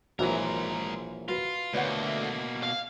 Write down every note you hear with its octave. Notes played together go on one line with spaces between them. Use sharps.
A#1 E3 F#3 G#3 F#4 A#4 E5
F4 F#4 B4
D2 B2 A#3 B4 C#5 F#5
E5
F5